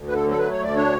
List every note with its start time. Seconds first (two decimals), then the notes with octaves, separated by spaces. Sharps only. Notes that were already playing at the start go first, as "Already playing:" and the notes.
Already playing: D2
0.09 D3 B4
0.14 A4
0.26 F#3 A4
0.39 A3 B4
0.51 C#5
0.59 D2 D5
0.76 D4 C#5